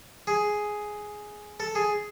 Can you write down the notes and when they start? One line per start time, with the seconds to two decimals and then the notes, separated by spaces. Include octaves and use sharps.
0.27 G#4
1.60 A4
1.75 G#4